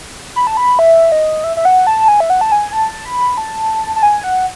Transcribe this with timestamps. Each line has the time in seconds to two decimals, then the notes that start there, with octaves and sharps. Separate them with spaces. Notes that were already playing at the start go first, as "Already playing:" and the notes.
0.36 B5
0.47 A5
0.57 B5
0.79 E5
1.12 D#5
1.44 E5
1.57 E5
1.65 F#5
1.87 A5
2.08 G#5
2.20 E5
2.30 F#5
2.41 A5
2.52 G#5
2.73 A5
3.05 B5
3.37 A5
3.96 A5
4.03 G#5
4.24 F#5